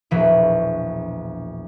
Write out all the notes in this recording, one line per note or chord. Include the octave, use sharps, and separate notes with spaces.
E1 A#1 E3